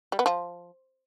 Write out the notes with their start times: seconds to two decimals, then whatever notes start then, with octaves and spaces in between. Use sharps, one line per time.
0.12 G3
0.19 B3
0.26 F3